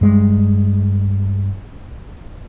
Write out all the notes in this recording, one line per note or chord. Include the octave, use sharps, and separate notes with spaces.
G2 G#3